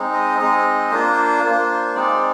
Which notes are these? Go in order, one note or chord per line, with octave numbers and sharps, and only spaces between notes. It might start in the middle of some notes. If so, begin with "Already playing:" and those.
Already playing: G#3 C4 D#4
D#5
G#3 C4 D#4
A#3 D4 F4 C5
A#3 D4 F4
G#3 C4 D#4 D5